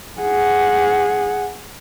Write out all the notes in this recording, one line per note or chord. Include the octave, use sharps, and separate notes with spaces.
G#4 F#5